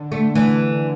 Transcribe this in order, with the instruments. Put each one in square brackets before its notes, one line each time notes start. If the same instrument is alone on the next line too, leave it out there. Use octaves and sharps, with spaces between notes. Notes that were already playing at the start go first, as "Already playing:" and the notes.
Already playing: [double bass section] D3
[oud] A3
E3